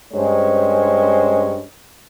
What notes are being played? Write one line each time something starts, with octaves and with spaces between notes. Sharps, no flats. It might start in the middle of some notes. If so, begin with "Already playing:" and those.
G2 G#3 C#4 C5 C#5